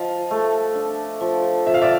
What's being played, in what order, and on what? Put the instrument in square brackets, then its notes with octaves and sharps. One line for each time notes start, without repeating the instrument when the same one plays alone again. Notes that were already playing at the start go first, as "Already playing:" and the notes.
Already playing: [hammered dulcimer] F3 [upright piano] D#5 F5
[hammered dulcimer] A3
D4
F3
[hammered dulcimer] F3 [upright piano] E5
[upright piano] F5
D5 E5